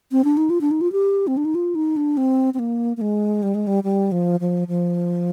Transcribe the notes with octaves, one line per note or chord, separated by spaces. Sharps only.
C4
D4
D#4
F4
D4
D#4
F4
G4
C4
D4
D#4
F4
D#4
D4
C4
C4
A#3
A#3
G#3
G3
G#3
G3
G3
F3
F3
F3